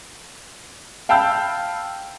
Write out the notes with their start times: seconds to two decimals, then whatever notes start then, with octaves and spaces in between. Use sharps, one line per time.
1.09 F5 G5 A5 B5 E6 G6